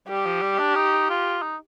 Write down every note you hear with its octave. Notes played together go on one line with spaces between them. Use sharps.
G3 G4
F3
G3
D4
D#4
F4
D#4